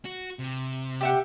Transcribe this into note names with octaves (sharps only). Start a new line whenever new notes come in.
F#4
C3
G4 E5 F#5